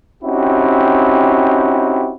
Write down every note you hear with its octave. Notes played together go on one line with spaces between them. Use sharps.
C4 C#4 D#4 E4 F#4 G4